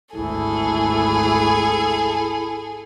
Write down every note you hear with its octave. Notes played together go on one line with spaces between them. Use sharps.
G#1 D2 E4 G#4 A4